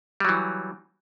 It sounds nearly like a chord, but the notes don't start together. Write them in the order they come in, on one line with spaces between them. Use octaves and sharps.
G3 F#3 E3